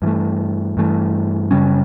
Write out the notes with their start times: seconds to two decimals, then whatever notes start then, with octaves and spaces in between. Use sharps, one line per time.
0.02 G2 E3 A3
0.77 G2 E3 A3
1.51 F#2 C#3 G3 C#4